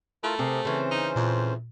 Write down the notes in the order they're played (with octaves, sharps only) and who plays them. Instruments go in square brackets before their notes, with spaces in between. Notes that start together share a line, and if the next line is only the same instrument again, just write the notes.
[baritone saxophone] A3 [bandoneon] E4 F4 A#4 [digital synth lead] B5
[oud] C3 [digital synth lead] C4 [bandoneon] G#4 A#4
[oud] C#3 E3 [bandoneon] C#4 C5
[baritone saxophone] D#4
[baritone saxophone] F2 [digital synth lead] A#2